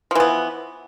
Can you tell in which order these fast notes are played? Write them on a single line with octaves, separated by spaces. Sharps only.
F3 E3 B3